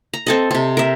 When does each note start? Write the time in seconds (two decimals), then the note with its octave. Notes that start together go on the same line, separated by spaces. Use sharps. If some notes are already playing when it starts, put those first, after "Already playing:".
0.14 A#5
0.26 C4 A4 D#5
0.51 C3 C4
0.77 A#4 E5